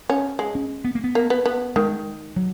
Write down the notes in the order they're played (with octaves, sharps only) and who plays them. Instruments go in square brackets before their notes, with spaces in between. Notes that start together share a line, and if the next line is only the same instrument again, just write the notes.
[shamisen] C#4
G#3
[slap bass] C#4
B3
A#3
B3
[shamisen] A#3
B3
B3
[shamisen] D#3 [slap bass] G#3
[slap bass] F#3